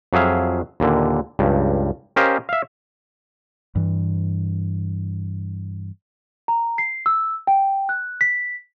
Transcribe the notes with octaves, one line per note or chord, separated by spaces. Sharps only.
F2 F#3 G#4 E5 F5
D#2 A#2 D3
C#2 G2
C#4 G4 A#4 C5 D#5 F5
E5 F5
G2 E3
A#5
C7
E6
G5
F#6
B6